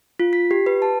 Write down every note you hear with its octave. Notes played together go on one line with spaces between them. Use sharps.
F4
B6
G4
B4
A5